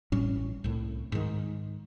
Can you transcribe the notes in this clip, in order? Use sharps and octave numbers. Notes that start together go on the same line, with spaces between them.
A1 A2 G3 C#4
C2 A2
G#2 D#3